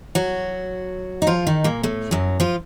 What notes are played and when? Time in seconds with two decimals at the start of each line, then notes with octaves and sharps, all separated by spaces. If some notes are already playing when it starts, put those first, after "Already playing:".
0.15 F#3 F#4
1.22 D#4
1.27 F3 F4
1.47 D#3 D#4
1.64 A#2 A#3
1.83 A2 A3
2.11 F#2 F#3
2.40 F3 F4